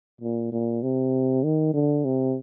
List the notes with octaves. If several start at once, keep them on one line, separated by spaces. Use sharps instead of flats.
A#2
A#2
C3
D#3
D3
C3